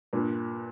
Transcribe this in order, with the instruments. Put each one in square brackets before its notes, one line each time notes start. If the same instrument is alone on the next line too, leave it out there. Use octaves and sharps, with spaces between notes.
[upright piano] G2 A#2